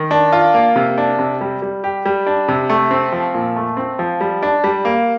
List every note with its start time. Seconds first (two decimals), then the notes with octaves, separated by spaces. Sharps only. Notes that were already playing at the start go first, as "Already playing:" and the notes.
Already playing: D#3
0.11 D4
0.33 F4
0.54 A#3
0.76 C3
0.98 D4
1.19 C3
1.41 G3
1.62 G3
1.84 G4
2.06 G3
2.26 D4
2.48 C3
2.70 A3
2.91 C4
3.12 F3
3.34 A#2
3.56 A3
3.77 C4
3.99 F3
4.21 G3
4.43 D4
4.64 G3
4.85 A#3